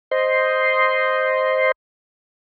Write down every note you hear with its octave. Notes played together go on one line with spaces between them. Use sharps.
C5 D#5 C6